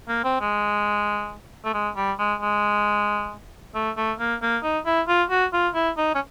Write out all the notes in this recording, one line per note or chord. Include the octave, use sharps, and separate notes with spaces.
A#3
C4
G#3
A3
G#3
G3
G#3
G#3
A3
A3
A#3
A#3
D#4
E4
F4
F#4
F4
E4
D#4
C#4